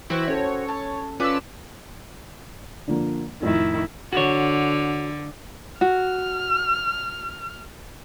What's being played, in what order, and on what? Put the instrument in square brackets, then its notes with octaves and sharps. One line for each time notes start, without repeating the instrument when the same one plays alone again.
[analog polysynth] E3 E4 [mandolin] C4 F#4
[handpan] C#4 A4 [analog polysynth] C#5
[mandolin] A5
[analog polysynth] C#4 A5 E6 [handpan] F4 [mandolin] B4 D5
[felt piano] D3 F3 A#3
[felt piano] F2 A2 [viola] D#3 E4
[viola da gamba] D3 [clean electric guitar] F#4 C#5
[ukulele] F#4 [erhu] F6